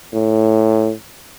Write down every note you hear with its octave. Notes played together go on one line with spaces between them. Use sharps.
A2